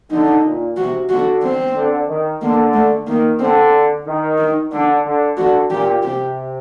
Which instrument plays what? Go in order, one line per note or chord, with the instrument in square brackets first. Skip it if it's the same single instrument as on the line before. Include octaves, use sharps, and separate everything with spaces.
[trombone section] D3 [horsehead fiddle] D#4
[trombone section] A#2
[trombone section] C3 [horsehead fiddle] F#4
[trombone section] D3 [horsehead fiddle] F#4
[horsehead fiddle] C4
[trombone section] D3
D#3
[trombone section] D3 [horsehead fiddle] A#3
[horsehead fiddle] A3
[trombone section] D#3 [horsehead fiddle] A#3
[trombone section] D3 [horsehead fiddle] C4
[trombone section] D#3
[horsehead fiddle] D#4
[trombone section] D3 [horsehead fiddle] D4
[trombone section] D3
[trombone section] D3 [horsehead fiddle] F#4
[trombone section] A#2 [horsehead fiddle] G4
[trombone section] C3 [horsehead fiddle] G4